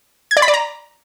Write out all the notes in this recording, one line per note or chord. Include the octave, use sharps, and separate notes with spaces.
G#6
D5
B5
D5
A#5